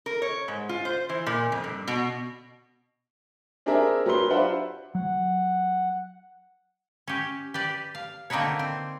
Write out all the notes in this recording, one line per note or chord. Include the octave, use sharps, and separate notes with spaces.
A#4
C#5
G#2
F4
C5
E3
A#2
F2
G2
B2
C4 D4 G4 G#4 A#4 E5
F#3 G4 A#4 B4 C6 G7
D4 F4 B4 C5 E5 F#5
F#3 F#5
C#4 G4
G4 B4 D5
F5
D3 A#3 C4 D#4 B4 C#5
C4